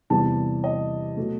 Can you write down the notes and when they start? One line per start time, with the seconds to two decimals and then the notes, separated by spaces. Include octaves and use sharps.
0.10 E2 C3 E3 G3 A5
0.64 D#5
1.17 B2 F#3 A3